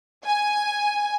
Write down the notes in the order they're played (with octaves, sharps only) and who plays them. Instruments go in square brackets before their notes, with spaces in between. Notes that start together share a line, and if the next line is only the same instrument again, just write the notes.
[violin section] G#5